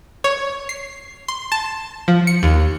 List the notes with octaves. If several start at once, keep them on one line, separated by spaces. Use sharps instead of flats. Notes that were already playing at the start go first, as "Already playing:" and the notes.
C#5
C7
C6
A5
F3
C#7
D#2